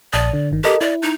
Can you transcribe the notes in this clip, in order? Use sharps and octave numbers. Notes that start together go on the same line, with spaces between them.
A#1 D5 A5 D#6
D3
G1 D#3
G4 A4 A#4 D#5
E4 D5
D#4